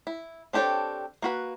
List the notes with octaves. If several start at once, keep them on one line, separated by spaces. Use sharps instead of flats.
E4
C4 D4 G4 A4 C#5
A#3 F#4 B4